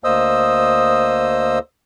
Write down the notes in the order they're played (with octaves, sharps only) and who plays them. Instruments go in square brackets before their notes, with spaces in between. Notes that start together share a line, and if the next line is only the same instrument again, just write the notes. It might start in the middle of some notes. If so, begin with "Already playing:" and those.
[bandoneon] D2 A#3 C5 D#5 D#6 E6